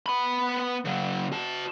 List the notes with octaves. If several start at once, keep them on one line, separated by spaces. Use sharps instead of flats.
B3 B5
C#3 F#3
F#4 A5